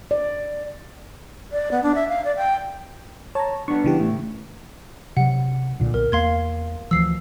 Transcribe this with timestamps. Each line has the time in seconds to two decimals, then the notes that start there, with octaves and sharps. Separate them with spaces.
0.11 D5
1.52 D5
1.71 B3
1.83 D4
1.95 E5
2.09 F5
2.25 D5
2.37 G5
3.35 C#5 A5 A#5
3.68 G3 B3 D4 C#6
3.84 C#3 E3 G4
3.99 A2
5.17 C3 F#3 F#5
5.80 B1 A#2 D3
5.94 B1 A#4
6.12 E2 A#3 F5 C6 G#6
6.91 D2 E3 F3 E6 C7